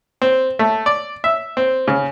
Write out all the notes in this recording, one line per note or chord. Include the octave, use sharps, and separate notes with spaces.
C4
A3
D5
E5
C4
C#3